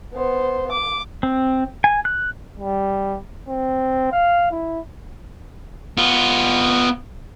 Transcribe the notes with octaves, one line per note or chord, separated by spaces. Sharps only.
B3 C5
D6
C4
G#5
F#6
G3
C4
F5
E4
B3 F4